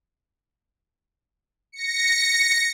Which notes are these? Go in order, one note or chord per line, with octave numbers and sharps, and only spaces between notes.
A#6 C#7